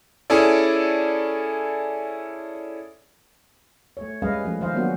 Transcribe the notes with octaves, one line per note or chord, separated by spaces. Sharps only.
C#4 E4 G#4 A4 D5
A3 C#5
G3 G#3 C#4 B4 D#5 F5
F3 A3 C#4
D#3 F3 C5 D#5 F5
F#3 A#3 B3 C#4 D4 F#4